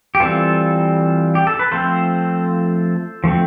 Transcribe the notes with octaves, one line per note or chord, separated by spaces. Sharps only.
G4
E3 G3 C4 F4 A4
G4
A4
B4
F3 A3 C4 A4 C5
F3 A3 C4